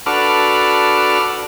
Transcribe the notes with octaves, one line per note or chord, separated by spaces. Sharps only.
D4 F#4 A4 B4 D6 F6